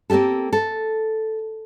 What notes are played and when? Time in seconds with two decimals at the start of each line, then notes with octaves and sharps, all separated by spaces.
0.10 A#3 C4 C#4 G4 A4
0.53 A4